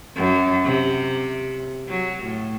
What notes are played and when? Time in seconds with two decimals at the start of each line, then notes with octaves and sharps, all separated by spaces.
0.16 F#2
0.64 C3
1.88 F#3
2.24 A2